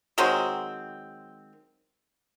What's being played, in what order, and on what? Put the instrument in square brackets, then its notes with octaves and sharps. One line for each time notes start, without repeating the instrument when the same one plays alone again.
[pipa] D#3 F#3 G#3 C4